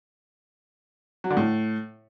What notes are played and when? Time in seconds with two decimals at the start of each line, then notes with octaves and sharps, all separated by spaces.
1.24 F#3
1.30 D3
1.37 A2